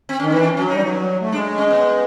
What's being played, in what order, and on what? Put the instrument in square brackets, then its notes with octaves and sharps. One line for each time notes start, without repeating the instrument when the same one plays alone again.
[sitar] C4
C#4
[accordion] D#3
[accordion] E3 [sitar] C4
[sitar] D4
C#4
[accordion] F#3 [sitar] C#4
[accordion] G3 [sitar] D#4
[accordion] F#3
A3
[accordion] G#3 [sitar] D4
[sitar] C#4
B3